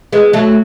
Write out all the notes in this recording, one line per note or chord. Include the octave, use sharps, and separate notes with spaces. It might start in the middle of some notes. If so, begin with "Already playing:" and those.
G#3 B3
F#3 A3